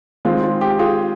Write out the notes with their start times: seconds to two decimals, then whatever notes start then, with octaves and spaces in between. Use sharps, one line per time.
0.25 D#3 G#3 C4 F4
0.43 F4
0.61 G4
0.79 F4 G#4